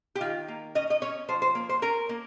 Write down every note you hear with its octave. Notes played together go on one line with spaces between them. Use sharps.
G4
D#3 F4
A#3
C#4 D#5
D#5
C#4 C#5
F3 C5
C5
A#3
C5
C#4 A#4
A#3